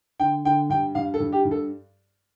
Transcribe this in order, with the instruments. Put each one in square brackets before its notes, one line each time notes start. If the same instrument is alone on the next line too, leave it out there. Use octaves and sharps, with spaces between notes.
[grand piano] D3 G5
D3 G5
G2 G5
G2 F5
A4
G2
G4
G2
A4